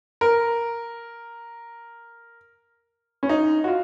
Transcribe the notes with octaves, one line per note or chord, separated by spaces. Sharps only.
A#4
C#4
D#4
F#4
F4